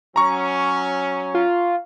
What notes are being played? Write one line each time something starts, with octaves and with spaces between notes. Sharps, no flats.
F#3 C#4 A#5 C#6
F4